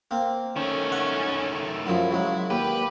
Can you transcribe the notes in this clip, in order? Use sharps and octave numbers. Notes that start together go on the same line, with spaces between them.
A#3 C4
D#3 A3 C#4
F#5
F#2 F3 E4
C#3 F#3 G#3
D#2 G4 B4